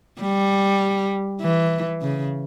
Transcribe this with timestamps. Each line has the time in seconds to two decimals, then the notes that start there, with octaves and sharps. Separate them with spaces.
0.22 G3
1.41 E3
2.02 C#3